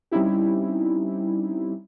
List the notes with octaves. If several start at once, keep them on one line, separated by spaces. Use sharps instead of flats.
G3 C4 C#4 D#4 E4 G4